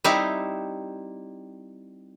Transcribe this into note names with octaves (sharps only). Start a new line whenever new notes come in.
G3 C4 D#4 E4